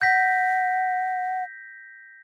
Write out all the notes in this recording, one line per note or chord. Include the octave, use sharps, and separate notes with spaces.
F#5 G6 A#6 B6